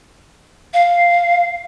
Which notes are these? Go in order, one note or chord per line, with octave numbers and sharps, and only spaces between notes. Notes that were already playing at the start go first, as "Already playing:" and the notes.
F5